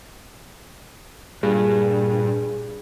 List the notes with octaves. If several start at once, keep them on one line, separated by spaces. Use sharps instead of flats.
G2 A#2 G#4